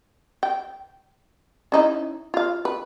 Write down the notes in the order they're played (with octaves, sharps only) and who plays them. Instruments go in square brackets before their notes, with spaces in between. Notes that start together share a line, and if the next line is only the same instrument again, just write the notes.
[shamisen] G5
C#4 D#4 E4
F4 F5
B4